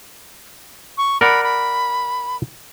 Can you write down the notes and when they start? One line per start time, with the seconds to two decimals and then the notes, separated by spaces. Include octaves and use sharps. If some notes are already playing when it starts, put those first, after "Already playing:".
0.98 C#6
1.21 A#4 D5 F#5 B5
1.43 B5